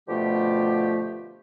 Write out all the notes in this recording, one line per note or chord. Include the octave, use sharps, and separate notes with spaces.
B2 D3 F3 A3 F4 G4